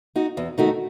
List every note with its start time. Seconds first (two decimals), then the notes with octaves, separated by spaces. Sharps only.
0.16 D#4 F#4
0.37 E2
0.58 D#3 A3 D#4 F#4